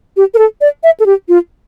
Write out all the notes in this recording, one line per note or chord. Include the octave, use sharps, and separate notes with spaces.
G4
A#4
A4
D5
E5
A4
G4
F4